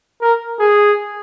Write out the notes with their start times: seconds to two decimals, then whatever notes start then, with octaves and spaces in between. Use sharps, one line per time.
0.21 A#4
0.59 G#4